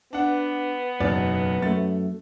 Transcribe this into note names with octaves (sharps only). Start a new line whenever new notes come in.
B3 D4 F#5
F#1 B1 E2 D5
F#2 A3 A6